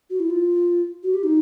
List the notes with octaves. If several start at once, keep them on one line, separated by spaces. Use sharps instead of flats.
F#4
E4
F4
F#4
G4
D#4